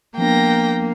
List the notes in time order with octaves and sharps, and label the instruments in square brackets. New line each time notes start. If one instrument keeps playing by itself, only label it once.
[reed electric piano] F3 B3 D4 [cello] A#3 [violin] G5 A#6